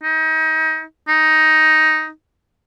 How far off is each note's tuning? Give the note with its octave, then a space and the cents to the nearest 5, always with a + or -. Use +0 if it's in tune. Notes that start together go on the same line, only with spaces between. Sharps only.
D#4 +30
D#4 +10